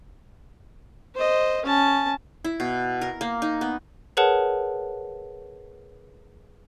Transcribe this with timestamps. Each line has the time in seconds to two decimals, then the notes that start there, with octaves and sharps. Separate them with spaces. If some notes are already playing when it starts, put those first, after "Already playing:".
1.15 C5 D#5
1.65 C#4 A5
2.44 E4
2.60 B2
3.01 A#4
3.21 A#3
3.42 D#4
3.61 B3
4.17 G#4 A#4 B4 C#5 F#5 A5